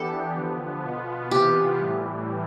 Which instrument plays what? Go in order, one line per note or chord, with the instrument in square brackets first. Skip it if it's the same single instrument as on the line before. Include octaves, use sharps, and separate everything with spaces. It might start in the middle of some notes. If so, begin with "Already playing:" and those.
Already playing: [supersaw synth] E3 B3 D4 G4 [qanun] A4
[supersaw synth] D3 F3 B3
B2 B3 F4
[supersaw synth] C3 E3 B3 F4 [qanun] G4
[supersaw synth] A2 E3 G3